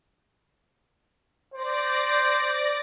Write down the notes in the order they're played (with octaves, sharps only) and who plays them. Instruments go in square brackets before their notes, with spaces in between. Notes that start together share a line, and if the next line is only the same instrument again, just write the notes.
[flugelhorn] C5 [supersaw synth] D5 D6 A#6